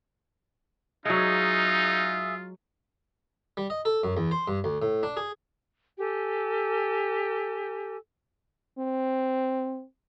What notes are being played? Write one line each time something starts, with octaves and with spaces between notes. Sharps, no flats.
F#3 G#3 D#4 F4 G#4 E5 F5
G3
D#5
A4
F#2
E2
C5
G2
D2
A2
D4
G#4
G4 A4 G#5
C4